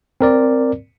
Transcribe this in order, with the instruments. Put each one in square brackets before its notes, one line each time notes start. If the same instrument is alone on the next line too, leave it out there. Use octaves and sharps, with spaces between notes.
[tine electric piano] C4 A#4 D5